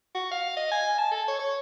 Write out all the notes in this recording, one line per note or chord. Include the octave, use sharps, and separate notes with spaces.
F#4
F5
D#5
G#5
A5
A4
C#5
C#5